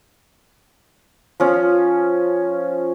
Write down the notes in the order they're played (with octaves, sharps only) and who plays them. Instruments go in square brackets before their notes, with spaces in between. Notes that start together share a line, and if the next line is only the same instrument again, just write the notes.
[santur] F3 C#4